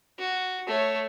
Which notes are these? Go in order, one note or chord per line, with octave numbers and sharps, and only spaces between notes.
F#4
A3 C#5